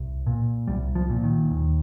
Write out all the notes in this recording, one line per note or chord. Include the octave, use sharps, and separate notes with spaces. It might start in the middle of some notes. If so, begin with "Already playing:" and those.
Already playing: C2
A#2
C2 G3
F3
A#2
D#3
D#2